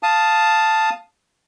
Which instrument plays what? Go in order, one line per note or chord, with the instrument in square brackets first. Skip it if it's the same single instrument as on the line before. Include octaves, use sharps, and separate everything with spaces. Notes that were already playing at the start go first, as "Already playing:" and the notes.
[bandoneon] F5 A5 D#6